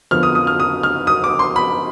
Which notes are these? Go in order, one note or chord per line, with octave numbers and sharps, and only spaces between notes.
F2 D3 F3 B3 F6
D#6
D#6
F6
D#6
F6
D#6
D6
C6
B5